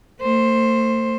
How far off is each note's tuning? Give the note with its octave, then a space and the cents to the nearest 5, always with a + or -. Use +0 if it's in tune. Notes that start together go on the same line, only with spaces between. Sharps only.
A3 +45 C5 +10